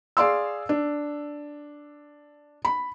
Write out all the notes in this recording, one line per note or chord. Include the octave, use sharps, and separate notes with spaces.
G#4 D5 F5 C6 E6
D4
B5